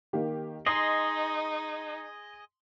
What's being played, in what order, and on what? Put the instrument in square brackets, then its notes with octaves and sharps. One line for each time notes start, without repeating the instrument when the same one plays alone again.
[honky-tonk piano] D#3 A#3 G4
[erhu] D#4 [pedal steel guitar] G#4 D#5 [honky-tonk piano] C6 D#6 C7